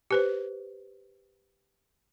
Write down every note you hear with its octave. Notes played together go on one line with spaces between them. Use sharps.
G4 B4 C5